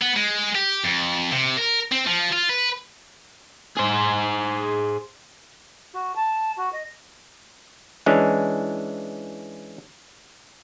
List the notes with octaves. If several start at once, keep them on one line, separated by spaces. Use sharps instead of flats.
B3
G#3
G4
F2
C3
A#4
C4
F3
F4
B4
G#4 C5
F#4
A5
F#4
D#5
E3 G#3 C#4 D4